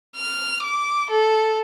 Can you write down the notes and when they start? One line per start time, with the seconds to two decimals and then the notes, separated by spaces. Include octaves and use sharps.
0.16 F6
0.63 D6
1.10 A4